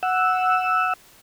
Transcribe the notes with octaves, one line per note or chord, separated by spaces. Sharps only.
F#5 E6